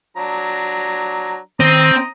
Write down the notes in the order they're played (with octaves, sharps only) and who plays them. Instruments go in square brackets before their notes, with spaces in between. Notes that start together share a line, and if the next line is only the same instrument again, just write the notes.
[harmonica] F#3 D4 A#5
[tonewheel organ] D#3 [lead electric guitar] C4 [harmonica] A#5 D#6